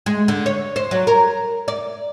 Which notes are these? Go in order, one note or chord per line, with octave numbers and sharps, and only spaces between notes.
G#3
D3
C#5
C5
F#3
A#4
D5